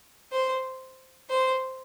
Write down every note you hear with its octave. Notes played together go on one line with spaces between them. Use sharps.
C5
C5